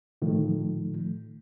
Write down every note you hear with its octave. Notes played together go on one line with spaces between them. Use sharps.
A2 D#3 F3 A3